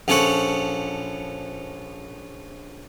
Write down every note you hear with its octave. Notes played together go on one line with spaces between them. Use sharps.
A#1 F3 C#4 A4 C#5 F#5